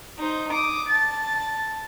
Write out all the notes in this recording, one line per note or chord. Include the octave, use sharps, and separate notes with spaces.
D#4 C5
D6 D#6
A5 A6